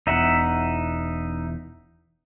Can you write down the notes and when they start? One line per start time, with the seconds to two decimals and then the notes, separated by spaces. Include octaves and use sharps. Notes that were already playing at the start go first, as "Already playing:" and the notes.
0.07 E1 E2 D#4 E5 F#5